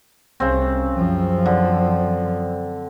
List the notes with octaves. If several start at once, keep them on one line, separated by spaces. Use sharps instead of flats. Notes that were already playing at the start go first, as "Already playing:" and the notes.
C2 C#3 C4
F#2 F3
D3